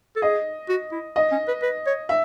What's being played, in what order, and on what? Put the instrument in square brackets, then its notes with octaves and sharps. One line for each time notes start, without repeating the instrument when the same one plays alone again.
[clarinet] A4
[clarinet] G#4 [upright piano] D#5
[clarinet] F#4
E4
[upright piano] D#5
[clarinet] C#4
B4
B4
C#5
[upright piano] E5